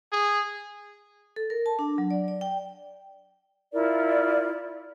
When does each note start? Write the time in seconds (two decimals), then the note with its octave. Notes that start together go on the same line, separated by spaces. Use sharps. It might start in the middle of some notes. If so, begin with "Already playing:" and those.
0.12 G#4
1.36 A4
1.50 A#4
1.66 A5
1.79 D4
1.98 F#3
2.11 D5
2.28 D5
2.41 G5
3.73 E4 F4 A#4 D5